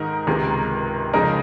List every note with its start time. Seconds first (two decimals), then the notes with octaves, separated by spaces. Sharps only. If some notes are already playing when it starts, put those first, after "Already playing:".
Already playing: G#2 D#3 G#3 D#4 A#4
0.27 C#2 C3 D#3 G#3
1.13 F2 C#3 G#3 D#4 A#4